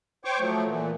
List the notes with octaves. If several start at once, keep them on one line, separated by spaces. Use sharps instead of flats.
C5 C#5 G5 C#6 D6
F3 F#3 A3
A#2 E3